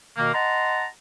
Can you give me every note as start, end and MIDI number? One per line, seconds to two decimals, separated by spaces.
0.16 0.33 47
0.16 0.33 51
0.16 0.33 58
0.33 0.84 75
0.33 0.84 78
0.33 0.84 81
0.33 0.84 82
0.33 0.84 84